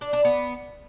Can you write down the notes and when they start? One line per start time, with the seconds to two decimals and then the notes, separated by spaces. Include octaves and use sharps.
0.01 D4
0.13 D4
0.25 B3